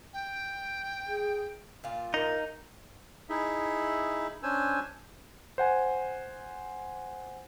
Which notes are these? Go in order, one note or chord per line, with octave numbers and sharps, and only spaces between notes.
G5
G#4
A#2 F4
D#4 A#4
D#4 E4 G#4 E5
C#4 D4 C5 G#5 E6
C5 F#5 G#5